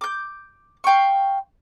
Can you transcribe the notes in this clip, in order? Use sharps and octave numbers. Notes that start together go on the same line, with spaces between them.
D6 G6
F5 G5 C6 C#6